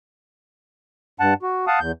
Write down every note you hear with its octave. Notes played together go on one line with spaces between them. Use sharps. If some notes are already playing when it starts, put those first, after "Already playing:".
G2 F#5 A5
F#4
F5 F#5 A5 D#6
E2 G6